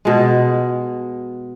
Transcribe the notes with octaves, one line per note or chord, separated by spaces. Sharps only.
B2 G#3